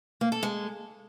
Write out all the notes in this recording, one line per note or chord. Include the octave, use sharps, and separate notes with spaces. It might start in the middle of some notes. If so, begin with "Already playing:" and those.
A#3
A4
G#3